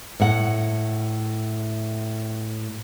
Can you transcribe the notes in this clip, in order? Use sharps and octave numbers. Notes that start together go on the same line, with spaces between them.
A2 F#5